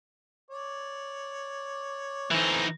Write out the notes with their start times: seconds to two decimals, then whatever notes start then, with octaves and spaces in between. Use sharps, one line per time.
0.51 C#5 D5
2.31 E3 A3 C4 C#4 D#4